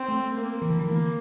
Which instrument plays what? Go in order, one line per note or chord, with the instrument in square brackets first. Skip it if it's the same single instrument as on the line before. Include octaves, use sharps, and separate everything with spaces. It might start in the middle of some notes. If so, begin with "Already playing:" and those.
Already playing: [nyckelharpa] C4
[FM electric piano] A3
[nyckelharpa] A#3
[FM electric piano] E3
D3
E3
[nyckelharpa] A#3